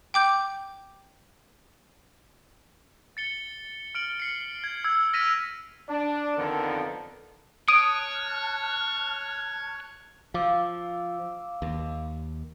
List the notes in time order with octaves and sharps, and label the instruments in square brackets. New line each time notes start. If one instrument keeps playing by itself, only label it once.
[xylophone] G5 D6 G6
[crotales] A6 C#7 G7
F6 D7 F#7
C7 C#7
G#6
E6 G#6
F6 A#6 B6 D#7 F7
[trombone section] D4
F2 D3 D#3 B3 A4 A#4
[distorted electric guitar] C#5 [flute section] A5 F6 F#6 [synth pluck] D#6 [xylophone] D7
[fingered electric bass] F3 [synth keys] F5 D6 E6
[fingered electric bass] D#2